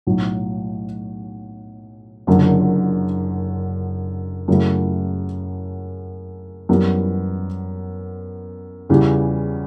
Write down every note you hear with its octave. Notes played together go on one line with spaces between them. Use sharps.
B1 A2 F#3
F#1 F#2 D3 F#3
F#2 C#3 F#3 A3 E4
F#2 E3 G3 B3
E2 C#3 E3 G3